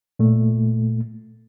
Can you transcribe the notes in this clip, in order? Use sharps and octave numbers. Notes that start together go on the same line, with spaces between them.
A#2 A3